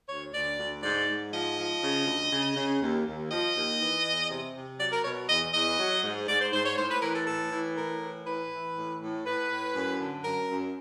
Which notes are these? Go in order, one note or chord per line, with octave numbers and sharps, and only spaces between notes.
D2 C#5
D2 D5
D2
G#2 D5
G#2
F3 D#5
F3
C#3
D2
C#3
C#3
D#2
D#2
F3 D#5
D#2
E3
E2
C3
C3
F#3 D5
A#4
B2 C#5
E2 D#5
E2 D#5
F#3
G#2
G#2 D5
C5
G#2 C5
C#5
A2 C5
B4
E3 A#4
A4
A2 A4
E3
A2 A#4
E3
E3 B4
E3
A2
A2
A2 B4
A2
F#2
D3
F#2 A#4
F#2